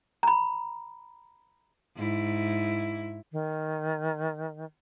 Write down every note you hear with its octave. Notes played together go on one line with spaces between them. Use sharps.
A#5 B5
G#2 E4
D#3